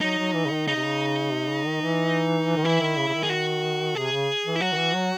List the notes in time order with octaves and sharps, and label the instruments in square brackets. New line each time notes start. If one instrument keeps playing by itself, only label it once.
[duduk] F#3 [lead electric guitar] D#4
[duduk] F#3
E3
C#3
D#3
[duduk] C#3 [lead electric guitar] D#4
[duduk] C3
C#3
C3
C#3
D#3
E3
D#3
[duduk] E3 [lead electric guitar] E4
[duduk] D#3
C#3
C#3
D#3
[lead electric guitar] G#4
F#4
[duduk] C3 [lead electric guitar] G#4
[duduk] C#3
E3
[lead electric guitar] E4
[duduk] F#3 [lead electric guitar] F#4
[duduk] D#3
E3
F#3